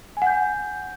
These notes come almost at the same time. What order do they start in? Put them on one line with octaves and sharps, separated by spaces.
G#5 F#5 G6